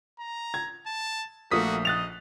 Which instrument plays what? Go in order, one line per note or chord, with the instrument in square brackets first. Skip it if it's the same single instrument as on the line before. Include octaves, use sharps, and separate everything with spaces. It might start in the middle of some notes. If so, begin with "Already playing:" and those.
[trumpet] A#5
[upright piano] G#6
[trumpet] A5
[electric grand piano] A#1 D#6 B6 [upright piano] A3 A#3 [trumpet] F#4
[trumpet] D#5 [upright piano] F#6 A6 F7